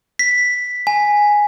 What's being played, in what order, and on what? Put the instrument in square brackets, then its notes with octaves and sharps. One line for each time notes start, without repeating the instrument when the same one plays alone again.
[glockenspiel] B6
G#5